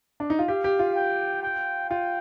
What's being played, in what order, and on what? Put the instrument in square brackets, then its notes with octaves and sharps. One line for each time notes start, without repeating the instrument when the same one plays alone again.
[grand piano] D4
D#4
F4
[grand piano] G4 [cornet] F5
[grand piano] G4
F4
[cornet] G5
G5
[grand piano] F4 [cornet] G5